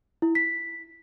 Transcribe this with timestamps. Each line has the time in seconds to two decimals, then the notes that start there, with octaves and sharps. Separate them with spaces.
0.22 E4
0.35 B6